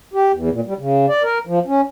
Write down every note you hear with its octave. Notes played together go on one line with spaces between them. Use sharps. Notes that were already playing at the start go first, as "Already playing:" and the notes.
G4
E2
A#2
G3
C#3
D5
A#4
F3
C#4